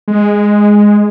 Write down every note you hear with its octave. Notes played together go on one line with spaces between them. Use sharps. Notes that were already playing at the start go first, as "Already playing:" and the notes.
G#3